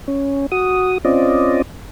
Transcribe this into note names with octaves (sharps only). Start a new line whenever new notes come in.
C#4
F#4 D#6
C4 C#4 F4 D5 D#5